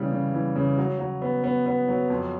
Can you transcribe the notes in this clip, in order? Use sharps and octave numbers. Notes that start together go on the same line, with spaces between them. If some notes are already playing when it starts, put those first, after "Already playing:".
Already playing: C#3 E3 G3
C#3
E3
C#3
F#3
F#3
B3
B3
B3
F#3
F2